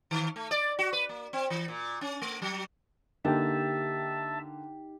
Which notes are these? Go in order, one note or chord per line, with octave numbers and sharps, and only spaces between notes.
D#3
A3
D5
F#4
B4
A#3
C4
E3
A#2
C#4
A3
F#3
D3 A#3 D#4 G4 E5 G5 A5